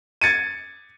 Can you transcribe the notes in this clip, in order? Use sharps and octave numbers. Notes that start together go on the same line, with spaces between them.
G#6 A6 C#7 D#7